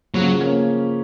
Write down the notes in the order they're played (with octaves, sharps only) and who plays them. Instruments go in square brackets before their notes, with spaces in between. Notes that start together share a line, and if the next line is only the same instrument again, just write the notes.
[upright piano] C#3 F3 [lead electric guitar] F#3
[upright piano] A#3 C#4